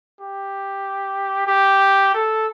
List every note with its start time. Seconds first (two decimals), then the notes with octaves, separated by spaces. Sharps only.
0.20 G4
1.47 G4
2.14 A4